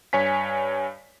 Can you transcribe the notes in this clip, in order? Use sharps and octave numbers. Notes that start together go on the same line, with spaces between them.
G2 C#5 G#5 B6